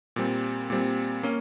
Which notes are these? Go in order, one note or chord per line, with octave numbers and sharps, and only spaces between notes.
A#2 G3 C4
A#2 G3 C4
A#3 C#4